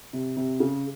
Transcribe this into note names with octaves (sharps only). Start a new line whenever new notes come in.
C3
C3
C#3